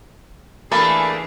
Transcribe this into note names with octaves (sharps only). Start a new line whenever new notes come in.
E3 A3 A#3 D4 G#4 A4 G#5 B5